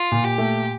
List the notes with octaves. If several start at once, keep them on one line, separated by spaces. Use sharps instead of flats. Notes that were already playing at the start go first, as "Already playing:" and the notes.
Already playing: F4
A#2
G4
A3